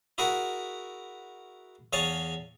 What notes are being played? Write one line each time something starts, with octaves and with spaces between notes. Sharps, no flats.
E4 F#4 G#4 A#4 F#5
E2 G#4 C#5 F5 G#5 A5